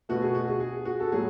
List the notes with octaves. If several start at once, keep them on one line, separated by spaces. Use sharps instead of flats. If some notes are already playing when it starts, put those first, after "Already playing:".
B2 A3 F#4
G#4
F#4
G#4
G#4
F#4
A4
A2 F#3 G#4